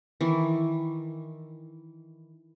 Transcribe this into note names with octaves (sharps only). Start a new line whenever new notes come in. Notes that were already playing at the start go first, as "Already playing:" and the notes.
D#3 E3